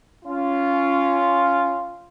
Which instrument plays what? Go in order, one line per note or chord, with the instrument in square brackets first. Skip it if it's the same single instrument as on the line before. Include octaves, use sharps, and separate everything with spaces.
[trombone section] C#4 F4